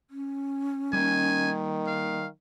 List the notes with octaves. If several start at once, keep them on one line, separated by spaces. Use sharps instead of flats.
C#4
D#3 G3 A#3 G#5
F5